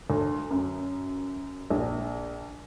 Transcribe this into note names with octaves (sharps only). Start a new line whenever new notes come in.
D2
F#2
A#1